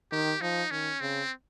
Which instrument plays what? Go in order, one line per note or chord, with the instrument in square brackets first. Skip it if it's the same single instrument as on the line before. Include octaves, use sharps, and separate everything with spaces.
[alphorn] D#3 [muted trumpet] G4
[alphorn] F3 [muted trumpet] D#4
[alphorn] D#3 [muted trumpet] C#4
[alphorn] C#3 [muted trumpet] C4